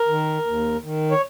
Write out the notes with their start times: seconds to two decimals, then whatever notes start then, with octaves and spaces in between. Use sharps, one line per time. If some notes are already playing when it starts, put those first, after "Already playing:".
Already playing: A#4
0.08 D#3
0.46 D#2
0.84 D#3
1.11 C#5